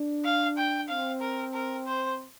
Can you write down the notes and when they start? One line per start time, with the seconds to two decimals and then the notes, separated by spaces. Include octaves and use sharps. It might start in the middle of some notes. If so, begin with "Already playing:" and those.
Already playing: D4
0.24 F5
0.58 G5
0.89 C4 F5
1.21 A#4
1.54 A#4
1.86 C5